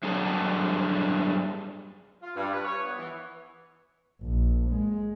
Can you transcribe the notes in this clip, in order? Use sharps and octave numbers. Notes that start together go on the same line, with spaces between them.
G2 F#3 D4 G#4 A4
F4
G2
B4
C#5
B3
E3
A#1
G#3